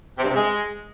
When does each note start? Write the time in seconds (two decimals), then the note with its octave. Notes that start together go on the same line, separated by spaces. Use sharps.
0.18 C3
0.24 G2
0.30 C3
0.35 G#3